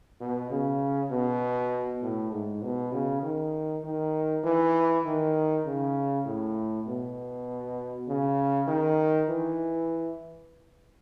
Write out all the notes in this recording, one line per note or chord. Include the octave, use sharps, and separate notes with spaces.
B2
C#3
B2
A2
G#2
B2
C#3
D#3
D#3
E3
D#3
C#3
A2
B2
C#3
D#3
E3